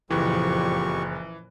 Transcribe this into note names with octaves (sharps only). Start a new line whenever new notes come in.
F#1 F2 A#2 E3 F3 G4 C#6